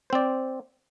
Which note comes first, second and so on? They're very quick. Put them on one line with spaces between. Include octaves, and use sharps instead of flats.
C5 C4 D5